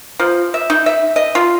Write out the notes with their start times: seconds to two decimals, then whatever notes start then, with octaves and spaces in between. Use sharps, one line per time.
0.19 F3
0.54 E5
0.70 D#4
0.86 E5
1.16 D#5
1.35 F4